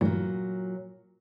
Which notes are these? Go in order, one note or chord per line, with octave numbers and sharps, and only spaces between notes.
G2 A#2 E3 F#3 A3